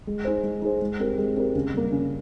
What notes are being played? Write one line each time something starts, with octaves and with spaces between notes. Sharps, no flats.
G#3
D#4 G#4 C5
G#3
D#4 G#4 C5
G#3
C4 G4 A#4
G#3
C4 G4 A#4
C#3
G3 A#3
C#3